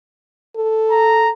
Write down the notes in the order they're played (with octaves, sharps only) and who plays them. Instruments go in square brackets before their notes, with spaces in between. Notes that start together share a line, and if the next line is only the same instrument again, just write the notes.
[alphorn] A4
[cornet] A#5